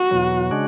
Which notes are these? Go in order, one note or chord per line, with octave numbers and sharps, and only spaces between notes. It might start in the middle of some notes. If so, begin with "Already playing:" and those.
Already playing: F#4
E2 B2 F#3
C#3 G#3 D4 F#4